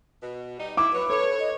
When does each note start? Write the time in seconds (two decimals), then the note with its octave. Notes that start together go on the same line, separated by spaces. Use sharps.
0.22 B2
0.59 G3 D#4
0.77 E4 D6
0.93 F#3 B4 C#5
1.10 A4 C#5
1.39 D#5